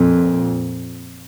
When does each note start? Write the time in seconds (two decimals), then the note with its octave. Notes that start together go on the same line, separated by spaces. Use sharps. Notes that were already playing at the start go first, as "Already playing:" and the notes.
Already playing: F2 A#2